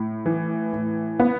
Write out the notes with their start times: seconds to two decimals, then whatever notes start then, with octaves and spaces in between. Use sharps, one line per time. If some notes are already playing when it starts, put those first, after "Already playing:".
Already playing: A2
0.26 E3
0.73 A2
1.20 B3